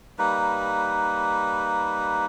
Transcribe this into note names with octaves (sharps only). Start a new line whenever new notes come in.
G3 A#3 D#4 B4